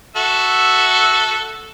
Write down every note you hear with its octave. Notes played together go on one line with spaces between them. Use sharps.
F#4 A4 E5